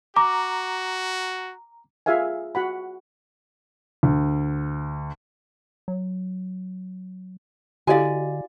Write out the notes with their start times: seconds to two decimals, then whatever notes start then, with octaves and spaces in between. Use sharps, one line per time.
0.16 F#4 A#5 D6
2.06 F4 G#4 E5 F5 G#5
2.55 F#4 F#5 B5
4.03 D2
5.88 F#3
7.87 D3 E4 F#4 G4 D5 D#5 F5 G#5